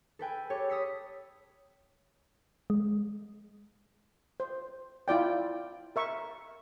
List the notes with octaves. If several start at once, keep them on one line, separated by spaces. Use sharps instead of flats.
A4 B4 G5 G#5
G4 A4 C#5
D#6 E6 B6 C#7
G#3
C5
E4 F4 D5 G5
A#4 E5 C#6